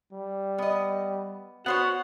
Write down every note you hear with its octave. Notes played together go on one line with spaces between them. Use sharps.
G3
B3 D#5
B3 F#4 C5 C#5 F#5